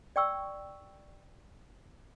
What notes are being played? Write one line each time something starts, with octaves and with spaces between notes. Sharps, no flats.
D5 G5 C#6 E6